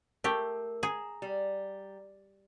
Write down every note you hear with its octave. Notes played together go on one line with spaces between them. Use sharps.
A3 G4 A#4
G#4 A#5
G3